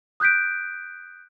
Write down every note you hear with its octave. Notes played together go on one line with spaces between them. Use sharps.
D#6 F#6 G6 B6 D7